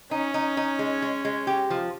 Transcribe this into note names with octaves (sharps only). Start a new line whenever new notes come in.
C#4 D#4
D#4
D#4
G#3
G#3
G#3
G4
F3